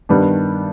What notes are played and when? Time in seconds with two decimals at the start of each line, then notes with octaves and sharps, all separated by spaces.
0.09 G2 D#3 G3 B3 D4